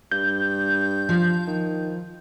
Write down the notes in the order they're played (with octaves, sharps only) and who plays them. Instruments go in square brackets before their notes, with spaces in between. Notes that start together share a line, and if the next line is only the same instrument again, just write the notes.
[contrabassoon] G2 [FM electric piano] G6
[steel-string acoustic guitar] F3
[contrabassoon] D#3